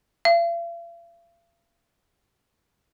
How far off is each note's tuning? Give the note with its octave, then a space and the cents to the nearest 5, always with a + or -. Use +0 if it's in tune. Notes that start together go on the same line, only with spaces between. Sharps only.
F5 -45